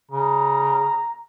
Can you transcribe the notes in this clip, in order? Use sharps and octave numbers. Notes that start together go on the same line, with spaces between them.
C#3 A#5